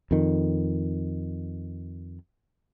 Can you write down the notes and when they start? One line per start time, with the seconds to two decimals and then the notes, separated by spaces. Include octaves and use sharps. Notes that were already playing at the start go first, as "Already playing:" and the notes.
0.11 F2 D#3